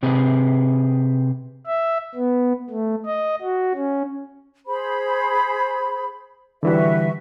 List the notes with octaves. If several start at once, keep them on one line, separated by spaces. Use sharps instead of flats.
C3 C4 G#4 B4
E5
B3
A3
D#5
F#4
C#4
G#4 C5 B5
D3 E3 G3 F#4 B4 E5